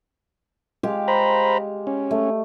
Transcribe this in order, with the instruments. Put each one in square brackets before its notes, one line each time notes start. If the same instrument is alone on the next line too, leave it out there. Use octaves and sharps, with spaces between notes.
[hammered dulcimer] G#3 G4 F5
[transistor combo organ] C5 A#5 B5
C#4
[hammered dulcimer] A3